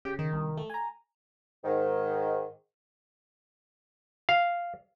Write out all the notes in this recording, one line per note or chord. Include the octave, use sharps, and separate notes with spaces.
C#3 G4
D#3
C2
A3
G#5 A#5
G#2 D#3
F5